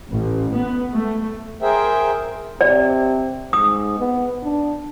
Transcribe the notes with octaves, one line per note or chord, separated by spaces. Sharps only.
A1
B3
A3
G#4 A#4 C5 E5 G5
C3 D5
G#2 D#6
B3
D4